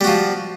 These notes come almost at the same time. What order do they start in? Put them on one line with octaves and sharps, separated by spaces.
G3 F#4 F3